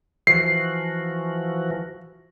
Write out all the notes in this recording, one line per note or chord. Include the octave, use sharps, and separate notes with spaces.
E3 F3 F#4 C7